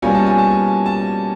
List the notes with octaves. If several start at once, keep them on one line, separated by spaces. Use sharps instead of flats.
B2 G3 A#3 C#4 F4 G#5
A5
G#5
A5
G#5
A5